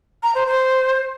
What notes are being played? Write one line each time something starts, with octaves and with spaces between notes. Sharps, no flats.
A#5
C5
C5